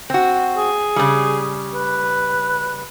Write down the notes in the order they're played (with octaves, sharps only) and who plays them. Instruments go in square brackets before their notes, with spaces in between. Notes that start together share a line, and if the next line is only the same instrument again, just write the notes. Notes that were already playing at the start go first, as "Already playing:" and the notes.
[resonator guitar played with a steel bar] C4 F#4
[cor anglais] G#4
[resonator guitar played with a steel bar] C#3 G3
[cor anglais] B4